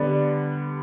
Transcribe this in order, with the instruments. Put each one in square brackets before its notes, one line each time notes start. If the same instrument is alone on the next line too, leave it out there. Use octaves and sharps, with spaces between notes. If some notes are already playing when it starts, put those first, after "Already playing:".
Already playing: [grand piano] D3 G3 B3 [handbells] D5